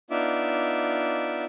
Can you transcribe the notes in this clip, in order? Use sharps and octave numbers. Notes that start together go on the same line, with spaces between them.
B3 D4 D#4 F4 E5 D6